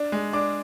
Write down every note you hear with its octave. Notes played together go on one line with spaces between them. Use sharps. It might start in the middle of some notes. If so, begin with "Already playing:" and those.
Already playing: D4
G#3
D4 D6